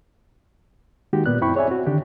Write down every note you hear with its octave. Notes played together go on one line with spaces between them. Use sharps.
D#3 G#3 A#3 D#4 F#4 G4
A#2 B3 D5 F#6
F#2 C4 E4 G5 B5 C#6
G#4 C#5 D5 E5 G#5
C4 F#4
D3 D#3 D4 G4